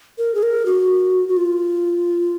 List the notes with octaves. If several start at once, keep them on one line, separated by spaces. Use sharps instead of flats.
A#4
G#4
A#4
F#4
F#4
F4